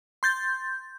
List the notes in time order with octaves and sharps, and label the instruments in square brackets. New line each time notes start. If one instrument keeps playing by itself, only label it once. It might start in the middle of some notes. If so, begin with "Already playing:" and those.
[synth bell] C6 G6 A6